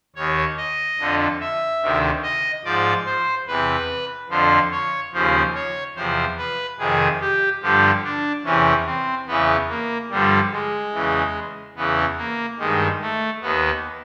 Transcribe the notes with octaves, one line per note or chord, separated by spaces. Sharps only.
D#2 D#3 C#5
D#5
F2 D3 F3
E5
D2 C3 D#3
D#5
G#2 F3 D5
C5
E2 C3 E3 B4
F2 D3 F3 C5
C#5
D#2 C#3 F3 C5
C#5
E2 C3 F3 C5
B4
F2 C3 D#3 G#4
G4
G2 D3 F3 G4
D4
E2 C3 E3 C#4
C4
E2 C#3 E3 B3
A#3
G2 D3 F3 G3
G#3
E2 C#3 E3
E2 C#3 E3 B3
A#3
G2 D#3 G#3
A3
D#2 D#3 B3